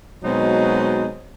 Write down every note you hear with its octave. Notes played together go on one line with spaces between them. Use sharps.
B2 F#3 G#3 C4 D#4